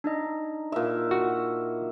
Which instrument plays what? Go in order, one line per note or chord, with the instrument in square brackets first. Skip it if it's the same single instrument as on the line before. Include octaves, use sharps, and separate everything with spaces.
[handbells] D4 D#4 D#5
[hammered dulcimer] A#2 E5
[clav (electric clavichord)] F#4